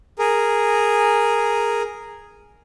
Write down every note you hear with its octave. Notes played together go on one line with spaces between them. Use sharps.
G#4 A#4